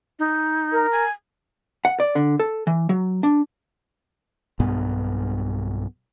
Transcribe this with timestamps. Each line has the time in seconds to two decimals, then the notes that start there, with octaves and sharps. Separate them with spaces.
0.19 D#4
0.72 A#4
0.92 G#5
1.85 F#5
2.00 D5
2.15 D3
2.40 A4
2.67 E3
2.89 F#3
3.23 D4
4.60 B1 G2 B2 B3